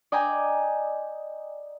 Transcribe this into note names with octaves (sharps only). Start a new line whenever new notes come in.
D5 D#5 G5 G#5 A#5 D6